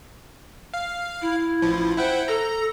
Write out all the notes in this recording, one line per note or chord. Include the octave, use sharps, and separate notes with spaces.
F5
E4
A1 F3
E4 C5 F#5 G5
A4 A#5